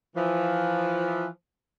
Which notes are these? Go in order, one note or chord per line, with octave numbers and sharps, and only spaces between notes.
E3 F3